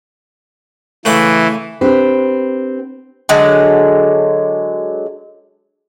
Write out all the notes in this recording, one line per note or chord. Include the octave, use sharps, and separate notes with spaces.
C#3 E3 A3 F#5
C4 D4 G4 B4
D3 F#3 G#3